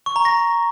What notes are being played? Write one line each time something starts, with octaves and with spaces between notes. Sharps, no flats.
C#6
A#5
A#6